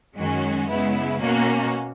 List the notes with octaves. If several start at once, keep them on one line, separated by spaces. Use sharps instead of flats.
F#2 D#3 G#3 C#4 F#4
C#3 G#3 B3 E4
B2 A#3 C#4 F#4